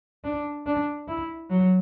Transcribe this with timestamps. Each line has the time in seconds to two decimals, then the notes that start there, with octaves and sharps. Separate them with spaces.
0.24 D4
0.66 D4
1.08 E4
1.50 F#3